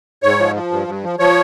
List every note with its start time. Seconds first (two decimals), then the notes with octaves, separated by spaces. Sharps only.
0.23 G#2 C#5
0.39 F3
0.55 F3
0.71 G2
0.88 G2
1.04 F3
1.19 F3 C#5